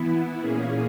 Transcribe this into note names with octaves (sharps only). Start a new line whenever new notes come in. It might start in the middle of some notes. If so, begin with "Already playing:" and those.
Already playing: E3 B3 E4
A#2 A#3 C#4 G#4